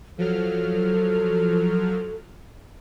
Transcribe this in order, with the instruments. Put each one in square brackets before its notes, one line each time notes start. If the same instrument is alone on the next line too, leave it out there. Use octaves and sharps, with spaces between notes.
[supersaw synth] F3 F#3 F6 [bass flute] A4